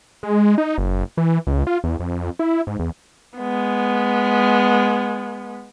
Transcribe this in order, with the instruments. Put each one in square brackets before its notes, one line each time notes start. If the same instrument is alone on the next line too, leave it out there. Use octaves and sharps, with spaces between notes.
[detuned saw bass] G#3
D#4
F#1
E3
C#2
F4
E2
F2
E4
G#2
E2
[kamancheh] G#3 B3